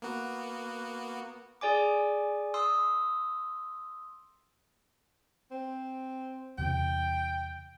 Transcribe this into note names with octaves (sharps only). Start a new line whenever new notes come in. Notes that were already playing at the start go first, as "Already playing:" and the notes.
A#3 B3 F#4
G#4 D5 G#5 D6
C6 D#6 E6
C4
E2 C3 E3 G5